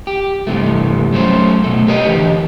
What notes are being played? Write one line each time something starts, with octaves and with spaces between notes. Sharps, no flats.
G4
G2 C3 E3 A3
F#3 A3 C#4 C5
B2 A3
G4 A#4 B4 C#5 D#5
D3 E3 E4 G4